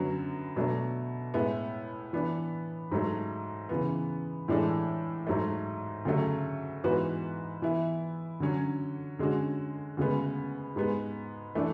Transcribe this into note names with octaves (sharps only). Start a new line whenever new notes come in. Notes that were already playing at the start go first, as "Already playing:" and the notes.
Already playing: F#2 D3 F#3 B3 F#4
B2 F#3 A3 D4
A2 G#3 B3 E4
E3 B3 D4
G#2 F#3 A3
C#3 E3 B3
A2 E3 G#3 D4 A4
G#2 F#3 A3
D2 C#3 F#3 A3
G#2 E3 B3 F#4 B4
E3 B3 E4
D3 F#3 C#4
D3 G#3 C#4 F#4
D2 C#3 G#3 B3
G#2 G#3 B3
E3 A3 D4